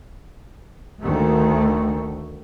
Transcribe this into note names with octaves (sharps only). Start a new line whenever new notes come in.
D2 D#3 A3